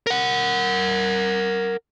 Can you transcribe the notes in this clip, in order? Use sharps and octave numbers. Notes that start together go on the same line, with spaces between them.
A#4 F#5